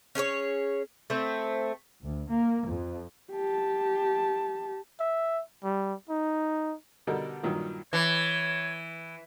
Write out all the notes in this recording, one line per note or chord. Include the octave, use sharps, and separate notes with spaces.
C#4 G#4 A#4 C#5
A3 C4
D2
A#3
F2
G4 A5
E5
G3
D#4
B2 D3 G3 D#4 A4 A#4
G2 A#2 D#3 F#3
E3 C#5